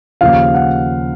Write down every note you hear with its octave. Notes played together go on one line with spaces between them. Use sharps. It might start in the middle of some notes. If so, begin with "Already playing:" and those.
D#2 C#3 F3 F5
F#5